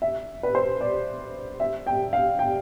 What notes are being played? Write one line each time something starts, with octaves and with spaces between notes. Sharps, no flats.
E5
B4
C5
D5
E5
G5
F5
G5